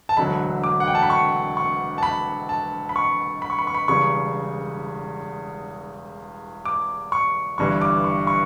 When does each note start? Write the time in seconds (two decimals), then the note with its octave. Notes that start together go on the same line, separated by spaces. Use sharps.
0.09 A5
0.17 E1 D2 D3 F#3 B5
0.64 D6
0.80 F#5
0.88 G5
0.95 A5
1.03 B5
1.10 C#6
1.57 C#6
1.98 A5
2.03 B5
2.49 A5
2.89 B5
2.96 C#6
3.42 B5
3.50 C#6
3.59 B5
3.67 C#6
3.75 B5
3.88 E1 E2 C#3 G3 C#6
6.65 D6
7.12 C#6
7.58 G1 G2 E3 G3 C#6
7.82 D6
8.04 C#6
8.27 C#6